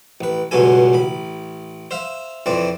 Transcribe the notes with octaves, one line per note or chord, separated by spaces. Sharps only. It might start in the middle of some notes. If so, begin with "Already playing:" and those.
A1 B4
C#2 G2 B2 F#3 A4 G#5
A1 B5
C5 E5 F5
F2 E3 C4 D5